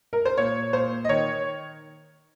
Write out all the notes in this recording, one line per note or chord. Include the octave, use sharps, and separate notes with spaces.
A#4
C5
A#2 C#5
A#2 C5
D#5
D#3 C#5